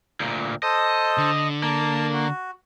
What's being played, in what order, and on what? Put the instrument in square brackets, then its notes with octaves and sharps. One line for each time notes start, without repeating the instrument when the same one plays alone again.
[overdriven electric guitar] D2 A#2
[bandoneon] A4 C5 A5 [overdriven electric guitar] D#5
[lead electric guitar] D3
[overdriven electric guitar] A#3 [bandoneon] A5
[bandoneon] F#4